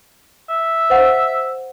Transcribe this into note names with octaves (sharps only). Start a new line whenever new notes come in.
E5
C5 D#5 F#5